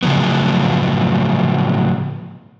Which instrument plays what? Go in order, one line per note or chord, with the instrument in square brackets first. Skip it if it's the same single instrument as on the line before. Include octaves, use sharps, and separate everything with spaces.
[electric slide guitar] A2 C#3 F3 F#3 B3